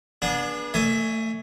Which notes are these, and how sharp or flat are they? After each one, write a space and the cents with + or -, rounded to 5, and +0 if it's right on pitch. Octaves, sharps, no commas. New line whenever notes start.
B3 -40 D4 -5 G#4 +0
A3 +30 E5 -25 G#5 +0